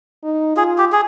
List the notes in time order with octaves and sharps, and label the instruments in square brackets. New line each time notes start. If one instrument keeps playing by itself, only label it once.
[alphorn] D#4
[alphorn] F4 [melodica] G#4
[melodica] G4
G#4